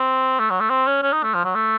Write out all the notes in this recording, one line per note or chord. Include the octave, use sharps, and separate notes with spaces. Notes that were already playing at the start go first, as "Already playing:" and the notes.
Already playing: C4
A3
F#3
A3
C4
C#4
C#4
D#4
A3
F3
F#3
A3